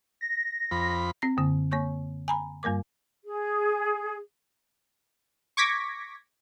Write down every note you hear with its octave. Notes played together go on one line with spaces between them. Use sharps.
A#6
F2 B5
C4 A#6
F#2 D3 A#3
A#3 C#5 C#6 G6
G#5 A#5 B5
G2 G3 A#3 A#4 D6
G#4
C#6 D6 G#6 A#6 B6